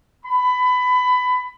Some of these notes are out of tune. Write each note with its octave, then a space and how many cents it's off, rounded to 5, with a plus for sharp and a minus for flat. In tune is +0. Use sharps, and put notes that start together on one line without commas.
B5 +20